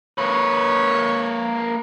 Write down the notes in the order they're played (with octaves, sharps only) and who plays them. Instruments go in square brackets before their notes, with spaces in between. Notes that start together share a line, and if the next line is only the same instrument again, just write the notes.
[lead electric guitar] A#3 B4 [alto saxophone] C#5